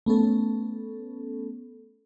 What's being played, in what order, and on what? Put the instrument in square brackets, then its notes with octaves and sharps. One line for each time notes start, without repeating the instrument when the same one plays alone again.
[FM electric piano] A3 B3 C#4 A4